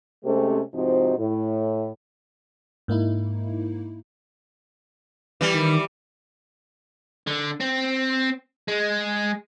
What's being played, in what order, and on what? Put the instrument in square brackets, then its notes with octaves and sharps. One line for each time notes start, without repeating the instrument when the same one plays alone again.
[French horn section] C3 G#3 A3 C4 C#4 G4
G#2 C3 F3 C4 D#4 F#4
A2
[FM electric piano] G#2 A#3 D#4 E4
[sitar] E3 G3
[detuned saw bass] D#3
[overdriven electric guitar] D3
C4
G#3